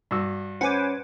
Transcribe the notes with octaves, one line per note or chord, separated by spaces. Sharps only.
G2 F#4 E6
C#4 B4 C5 F#5 G#5 D6